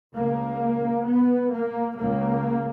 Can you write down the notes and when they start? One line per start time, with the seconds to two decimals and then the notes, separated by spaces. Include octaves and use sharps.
0.14 C#2 C#3 A#3
1.05 B3
1.51 A#3
1.96 C#2 C#3 A#3